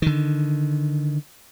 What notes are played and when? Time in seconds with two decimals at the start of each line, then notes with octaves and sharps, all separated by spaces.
0.02 D3 D#3